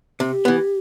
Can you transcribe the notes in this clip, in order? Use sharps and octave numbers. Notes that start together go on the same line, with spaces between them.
C3 G4
E3 B3